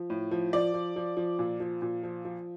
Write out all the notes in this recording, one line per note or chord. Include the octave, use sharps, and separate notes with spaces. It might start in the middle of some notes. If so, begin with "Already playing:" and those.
Already playing: F3
A2
F3
F3 D5
F3
F3
F3
A#2
F3
A#2
F3
F3